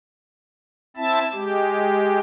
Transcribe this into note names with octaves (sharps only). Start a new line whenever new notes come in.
C4 E4 E5 A5
G#3 G4